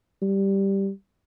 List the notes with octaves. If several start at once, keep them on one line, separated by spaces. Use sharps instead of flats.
G3